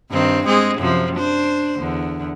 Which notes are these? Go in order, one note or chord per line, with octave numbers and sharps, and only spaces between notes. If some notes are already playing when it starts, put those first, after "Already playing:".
G2 D#3 C4
G#3 C4 G#4
F#2 C3 F3
D4 C5
E2 D3